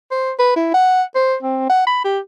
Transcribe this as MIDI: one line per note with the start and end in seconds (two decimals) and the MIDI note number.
0.11 0.32 72
0.39 0.54 71
0.56 0.69 64
0.74 1.03 78
1.15 1.36 72
1.42 1.66 60
1.70 1.85 78
1.87 2.00 83
2.04 2.19 67